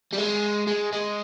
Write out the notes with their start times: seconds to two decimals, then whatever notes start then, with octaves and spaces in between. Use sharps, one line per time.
0.13 G3
0.18 G#3
0.67 G#3
0.93 G#3